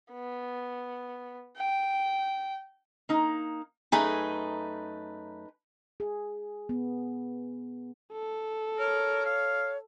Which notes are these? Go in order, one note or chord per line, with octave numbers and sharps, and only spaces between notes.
B3
G5
A#3 D#4
F#2 A3 D#4 G#4 B4 G#5
G#4
B3
A4
A#4 C#5
F5